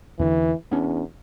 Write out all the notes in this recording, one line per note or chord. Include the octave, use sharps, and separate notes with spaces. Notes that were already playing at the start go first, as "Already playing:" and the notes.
E2 D3 E3
E2 B3 C#4 D4